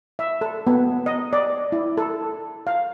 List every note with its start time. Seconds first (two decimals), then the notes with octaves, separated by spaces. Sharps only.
0.19 E5
0.41 A4
0.67 B3
1.06 D#5
1.33 D5
1.72 E4
1.97 A4
2.67 F5